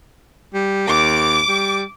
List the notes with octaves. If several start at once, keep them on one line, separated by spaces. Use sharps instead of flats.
G3
D#2 D6
G3